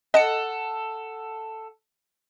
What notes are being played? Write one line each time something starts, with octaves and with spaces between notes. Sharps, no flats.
A4 D#5 F#5 C#7